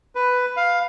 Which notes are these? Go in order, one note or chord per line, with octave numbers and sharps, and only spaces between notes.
B4
F5